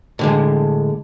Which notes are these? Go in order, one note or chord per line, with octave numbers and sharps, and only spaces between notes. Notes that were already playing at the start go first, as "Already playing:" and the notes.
A2 D3 G#3